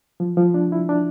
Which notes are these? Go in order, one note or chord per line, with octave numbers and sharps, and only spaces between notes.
F3
F3
D4
E4
D4